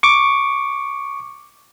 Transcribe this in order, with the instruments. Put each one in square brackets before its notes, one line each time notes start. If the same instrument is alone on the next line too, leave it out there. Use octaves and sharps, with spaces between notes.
[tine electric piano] C#6 D6